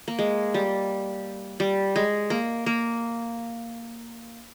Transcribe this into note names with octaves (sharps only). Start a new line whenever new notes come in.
A#3
G#3
G3
G3
G#3
A#3
A#3